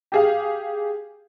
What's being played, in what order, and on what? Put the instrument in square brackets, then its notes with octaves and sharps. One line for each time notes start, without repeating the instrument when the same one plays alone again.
[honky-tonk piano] G4 G#4 F5